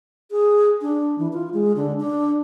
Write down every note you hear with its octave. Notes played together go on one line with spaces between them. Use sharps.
G#4
D4
E3
F4
G#3
D3
D4